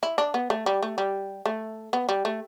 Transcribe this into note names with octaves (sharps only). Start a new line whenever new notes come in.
E4
D4
B3
A3
G3
A3
G3
A3
B3
G3
A3